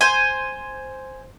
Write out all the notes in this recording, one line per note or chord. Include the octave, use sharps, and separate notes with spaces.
C5 G#5